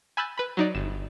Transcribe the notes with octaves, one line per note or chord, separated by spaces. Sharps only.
G#5 B5 E6 F#6 G6 A6
B4 B5
F#3 D#4 D5
G1 E7